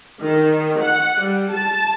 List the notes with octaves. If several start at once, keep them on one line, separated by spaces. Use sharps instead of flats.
D#3
F#5
G3
A5